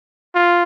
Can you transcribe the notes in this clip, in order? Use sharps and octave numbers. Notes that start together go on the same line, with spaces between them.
F4